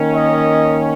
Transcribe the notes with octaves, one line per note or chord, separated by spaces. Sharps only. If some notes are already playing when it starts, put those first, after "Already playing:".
Already playing: D#3 A#3 C#4
D#5